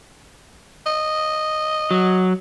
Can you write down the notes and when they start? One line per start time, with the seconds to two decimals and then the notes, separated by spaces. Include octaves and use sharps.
0.86 D#5
1.91 F#3